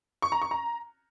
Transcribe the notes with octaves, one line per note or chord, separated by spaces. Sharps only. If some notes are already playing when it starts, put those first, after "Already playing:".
C#6
A#5
C#6
A#5